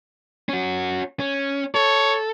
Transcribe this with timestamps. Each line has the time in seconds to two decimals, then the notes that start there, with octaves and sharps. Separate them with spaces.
0.49 C#4 F#4
1.20 C#4
1.75 A4 C#5